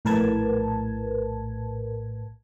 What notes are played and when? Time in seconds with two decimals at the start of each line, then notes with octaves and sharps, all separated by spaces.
0.05 A#1 A2 A#4 B4 A5 G#6